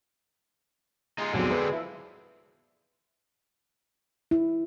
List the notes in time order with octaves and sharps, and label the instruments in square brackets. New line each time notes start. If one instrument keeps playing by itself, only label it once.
[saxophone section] G#3 G#4 [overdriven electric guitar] D#4 F4
[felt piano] B1 F2 F#3 [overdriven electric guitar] D3 C4
[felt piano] B4
[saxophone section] F3 E4
[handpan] E4